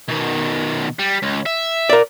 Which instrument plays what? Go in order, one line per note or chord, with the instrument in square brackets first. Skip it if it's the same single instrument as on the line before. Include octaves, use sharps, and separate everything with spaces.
[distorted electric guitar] B2 D#3
G3
C#2
E5
[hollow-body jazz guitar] A#4 D5